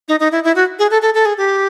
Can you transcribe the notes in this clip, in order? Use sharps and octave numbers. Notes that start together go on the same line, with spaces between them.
D#4
D#4
E4
E4
F#4
G#4
A4
A4
A4
G#4
G4